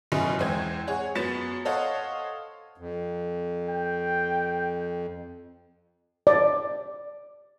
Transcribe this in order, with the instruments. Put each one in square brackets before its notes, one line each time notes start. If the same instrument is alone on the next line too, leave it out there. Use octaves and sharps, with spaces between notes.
[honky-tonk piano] F#1 B2 C#4 E4 D#5
E2 G#3 C4 G#6
G#4 C#5 F#5
F#2 B3 A6 E7
A4 C5 C#5 D#5 F5 F#5
[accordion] F2
[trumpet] G5
[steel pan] D5